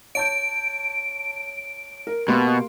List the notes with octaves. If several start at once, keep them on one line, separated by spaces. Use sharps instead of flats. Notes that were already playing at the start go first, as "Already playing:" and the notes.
C#5 A5 G6 D7
A#4
B2 A#3 G4 C6